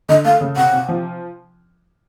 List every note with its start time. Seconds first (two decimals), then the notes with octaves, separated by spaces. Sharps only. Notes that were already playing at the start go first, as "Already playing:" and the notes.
0.09 D3 D#5
0.25 A3 F5
0.41 C#3
0.57 C3 F#5
0.73 C3
0.89 F3